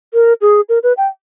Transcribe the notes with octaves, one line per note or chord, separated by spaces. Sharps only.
A#4
G#4
A#4
B4
G5